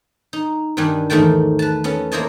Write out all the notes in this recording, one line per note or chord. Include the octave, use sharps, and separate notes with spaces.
D#4
G2 D#3 G3 D4 G#5
E2 G#2 D#3 A3 G5 A5
B4 A5
B3 C#4 A4
A#3 E4 C5 C#5 D#5 A5